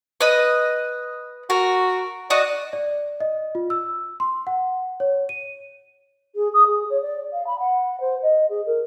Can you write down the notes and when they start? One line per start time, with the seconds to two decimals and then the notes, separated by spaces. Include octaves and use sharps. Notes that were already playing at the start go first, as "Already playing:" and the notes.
0.21 B4 D#5
1.50 F#4 A#4
2.30 F#4 D5 D#5
2.73 D5
3.20 D#5
3.55 F4
3.70 E6
4.20 C6
4.47 F#5
5.00 C#5
5.29 D#7
6.35 G#4
6.53 D#6
6.66 G#4
6.89 C#5
7.01 D5
7.32 F5
7.46 B5
7.59 F#5
8.00 C5
8.22 D#5
8.49 G#4
8.65 A#4